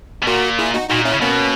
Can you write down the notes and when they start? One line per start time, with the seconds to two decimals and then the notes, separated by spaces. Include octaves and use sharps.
0.23 B2
0.27 A#2 F#4 A#4
0.59 E4 G#4
0.74 D#4 F#4
0.89 A#2 D#4 F#4
1.05 C#4 E4
1.14 C#3
1.21 B2 A#3 C#4